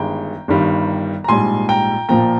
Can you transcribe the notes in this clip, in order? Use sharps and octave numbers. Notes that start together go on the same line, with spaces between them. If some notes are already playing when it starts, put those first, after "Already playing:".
Already playing: G1 G2 D#3 G#3 G5 A#5
G1 G2 D#3 G3
A#5
A#1 G#2 G3 G#5 C6
G5 A#5
A#1 A#2 F3 A#3 G5 A#5